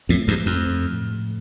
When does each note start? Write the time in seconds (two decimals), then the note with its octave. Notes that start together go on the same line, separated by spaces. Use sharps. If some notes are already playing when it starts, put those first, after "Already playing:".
0.09 F2 A2 A3
0.28 E2 G2
0.38 F3
0.46 F2
0.65 F3
0.93 A2